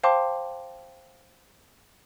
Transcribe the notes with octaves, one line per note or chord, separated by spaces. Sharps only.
C5 F5 G5 A5 C6 D6